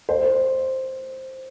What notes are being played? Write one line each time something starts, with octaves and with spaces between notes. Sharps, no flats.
C5